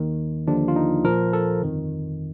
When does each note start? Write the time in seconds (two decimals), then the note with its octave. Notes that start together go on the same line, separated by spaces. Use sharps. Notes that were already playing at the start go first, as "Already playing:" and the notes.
Already playing: D#2 D#3
0.47 D#2 D3 F3 D4
0.68 F4
0.76 D#4
1.04 A#1 A#2 F3 A#4
1.33 A4
1.61 G1 F2 D#3